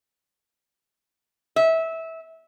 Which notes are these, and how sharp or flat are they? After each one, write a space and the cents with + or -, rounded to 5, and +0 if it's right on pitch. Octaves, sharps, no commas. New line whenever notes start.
E5 -20